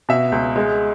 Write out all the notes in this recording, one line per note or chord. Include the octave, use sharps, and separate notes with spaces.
B2 E5
C#2
G#3